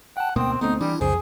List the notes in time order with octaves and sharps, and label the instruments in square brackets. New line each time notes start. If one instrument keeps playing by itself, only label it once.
[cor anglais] F#5 [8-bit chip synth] G5 A5
[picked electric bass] D2 B2 A#3 [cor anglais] C4 [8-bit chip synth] G5 D#6
[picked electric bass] D2 A3 C4 [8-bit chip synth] B3 [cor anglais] D#4
[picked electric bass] E3 [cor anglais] G3 [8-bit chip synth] D4 E4
[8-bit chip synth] C2 C#3 C5 [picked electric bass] F2 [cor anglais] G#4